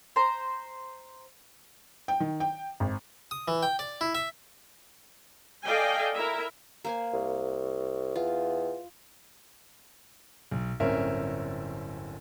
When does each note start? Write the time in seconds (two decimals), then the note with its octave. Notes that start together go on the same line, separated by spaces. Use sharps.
0.16 C5 A#5
2.08 G5
2.20 D#3
2.40 G5
2.80 G#1
3.31 D#6
3.48 E3
3.63 G5
3.79 D5
4.01 E4
4.15 E5
5.65 A4 D5 D#5 F5 G5 G#5
6.13 E4 A#4 E5
6.85 A#3 C5 G#5
7.14 C2
8.16 E2 F4
10.51 B1
10.80 D1 G1 C4 C#4 A#4 E5